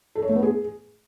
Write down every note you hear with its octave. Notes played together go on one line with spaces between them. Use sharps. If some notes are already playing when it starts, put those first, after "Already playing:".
A4
C#5
A3
B3
G#4